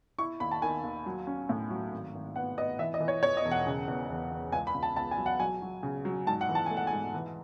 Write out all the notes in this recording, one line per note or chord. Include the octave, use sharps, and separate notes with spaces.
E4 C#6
D#2 B5
A5
D#3 G#5
D#2
F#3
C#4
A2
F#3
G#1
G#1
B3 F#5
B3 D#5
E3 E5
D#5
E3
C#5
E2 C#5
D#5
E1
F#5
C#3
E2
E2
E2
C#2 G#5
B5
C#2
A5
C#2 A5
G#5
F#3
F#5
F#3 G#5
F#3
C#3
F#3
G#2 A5
F#5
E3
A5
A3 G#5
F#5
G#5
G#2
E3